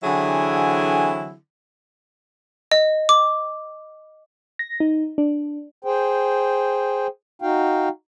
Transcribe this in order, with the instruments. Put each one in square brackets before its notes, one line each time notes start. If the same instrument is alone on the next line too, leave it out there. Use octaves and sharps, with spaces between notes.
[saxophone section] D3 E3 F#3 C4 E4 G#4
[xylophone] D#5
D6
[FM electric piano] A#6
D#4
D4
[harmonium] G#4 C5 G5
D#4 F#4 F5 G5